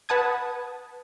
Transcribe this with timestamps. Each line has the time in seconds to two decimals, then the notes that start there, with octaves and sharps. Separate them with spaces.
0.09 B4 F#5 A5 D#6 G#6